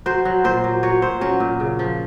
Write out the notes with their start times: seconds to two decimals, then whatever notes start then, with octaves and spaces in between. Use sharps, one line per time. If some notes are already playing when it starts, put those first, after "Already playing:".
0.06 F#3 C5
0.25 F#3
0.44 A#2 C5
0.64 F#3
0.83 F#3 C#5
1.02 A#2 C5
1.21 F#3 C#4
1.40 A#2
1.60 C#3
1.79 F3